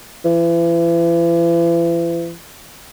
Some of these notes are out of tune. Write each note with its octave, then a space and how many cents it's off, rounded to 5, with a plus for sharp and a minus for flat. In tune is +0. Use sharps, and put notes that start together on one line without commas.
E3 +40